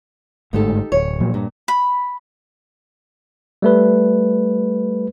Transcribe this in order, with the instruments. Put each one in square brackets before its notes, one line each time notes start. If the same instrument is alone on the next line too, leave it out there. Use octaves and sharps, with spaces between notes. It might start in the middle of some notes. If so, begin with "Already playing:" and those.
[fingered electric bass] G1 G#2 A3 [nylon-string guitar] D#4 G4 A4
[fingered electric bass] D1 [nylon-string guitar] C#5
[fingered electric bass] A#2 F3 F#3
[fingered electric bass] G2 [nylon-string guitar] A#2
[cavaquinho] B5
[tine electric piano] G3 A3 B4